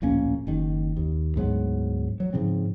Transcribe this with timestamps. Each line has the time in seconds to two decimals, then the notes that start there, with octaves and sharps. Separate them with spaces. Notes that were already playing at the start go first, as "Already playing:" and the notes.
0.02 D1 A#1 A#3 C#4
0.47 F#1 D#3
0.97 D#2
1.36 D2 G#2 F#3 B3
2.20 F#3
2.33 G#2 C#3 F3 C4